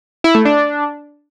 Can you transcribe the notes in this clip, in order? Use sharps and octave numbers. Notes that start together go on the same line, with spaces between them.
E4
A3
D4